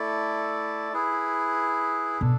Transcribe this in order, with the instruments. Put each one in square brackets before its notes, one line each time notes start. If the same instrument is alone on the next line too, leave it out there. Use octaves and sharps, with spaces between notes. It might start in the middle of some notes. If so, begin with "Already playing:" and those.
Already playing: [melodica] A3 E4 A4 D5
E4 G#4 B4
[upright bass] B2 [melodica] D4 A4